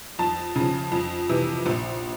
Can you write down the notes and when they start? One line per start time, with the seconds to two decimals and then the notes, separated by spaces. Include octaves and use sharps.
0.19 F2 A5
0.56 C#3 F3
0.92 F2
1.29 C3 E3
1.66 A#1